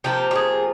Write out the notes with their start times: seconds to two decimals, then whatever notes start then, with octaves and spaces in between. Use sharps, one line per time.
0.04 C3 F3 A#3 G4
0.31 G4
0.35 G#4